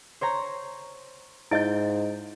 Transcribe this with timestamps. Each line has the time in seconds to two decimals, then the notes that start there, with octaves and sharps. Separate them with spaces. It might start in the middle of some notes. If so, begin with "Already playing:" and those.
0.21 C5 C#5 A#5
1.51 G#2 E4 D#5 G6 D7